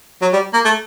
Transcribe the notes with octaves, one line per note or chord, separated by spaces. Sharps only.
F#3
G3
A#3
A3